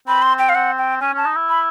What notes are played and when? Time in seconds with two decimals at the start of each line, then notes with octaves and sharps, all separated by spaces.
0.07 C4 B5
0.22 C6
0.39 G5
0.49 F5
0.54 C4 F#5
0.78 G5
1.01 C#4 G#5
1.13 C#4 A5
1.25 D#4
1.36 E4
1.49 B5